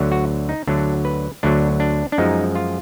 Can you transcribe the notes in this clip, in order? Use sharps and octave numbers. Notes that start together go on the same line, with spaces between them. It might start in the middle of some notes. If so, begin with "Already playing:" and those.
Already playing: D2 D3 F#3
F#4
D#4
D2 D3 F#3 D4
B4
D2 D3 F#3 D4
D4
D4
F#2 F3 G#3 D#4
F4